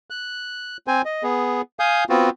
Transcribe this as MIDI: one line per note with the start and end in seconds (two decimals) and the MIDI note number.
0.10 0.77 90
0.87 1.02 60
0.87 1.02 72
0.87 1.02 80
1.05 1.23 75
1.23 1.61 59
1.23 1.61 68
1.79 2.04 77
1.79 2.04 80
1.79 2.04 87
1.79 2.04 91
2.10 2.30 59
2.10 2.30 60
2.10 2.30 65
2.10 2.30 66